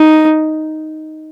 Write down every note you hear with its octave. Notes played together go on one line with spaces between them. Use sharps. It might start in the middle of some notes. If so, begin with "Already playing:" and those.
Already playing: D#4